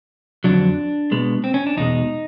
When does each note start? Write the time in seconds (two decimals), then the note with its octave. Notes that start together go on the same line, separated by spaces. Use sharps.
0.44 F2 D3 F#3 D4
1.11 B2 G#3 B3
1.44 C4
1.54 C#4
1.67 D4
1.77 E2 B2 G#3 D#4